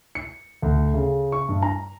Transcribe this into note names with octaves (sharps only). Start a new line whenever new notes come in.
C#7
D2
C#3
C#6
G2
A#5